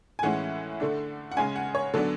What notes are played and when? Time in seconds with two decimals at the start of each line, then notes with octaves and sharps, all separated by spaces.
0.19 G#5
0.23 A2 E3 G#3 C#4 F#5
0.80 D3 A3 D4
1.32 F#5
1.37 C#3 G#3 C#4 G#5
1.56 F#5
1.75 C#5
1.94 D3 F#3 B3 D4 A4